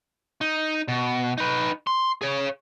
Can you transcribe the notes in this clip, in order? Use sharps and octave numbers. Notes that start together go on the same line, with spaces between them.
D#4
B2
D#4 B4
C6
G#4 C#5